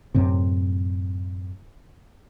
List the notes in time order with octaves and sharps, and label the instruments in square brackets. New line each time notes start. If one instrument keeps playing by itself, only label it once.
[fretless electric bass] F#2 A2 C3